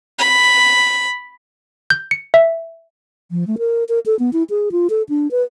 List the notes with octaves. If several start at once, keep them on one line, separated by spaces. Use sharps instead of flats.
B5
G6
C#7
E5
F3
A3
A#4
A#4
A4
B3
E4
G#4
F4
A4
D4
B4